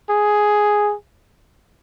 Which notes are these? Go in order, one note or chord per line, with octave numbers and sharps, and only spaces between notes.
G#4